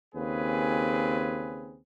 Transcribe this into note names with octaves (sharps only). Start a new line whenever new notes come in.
D#2 C#3 C4 G#4 B4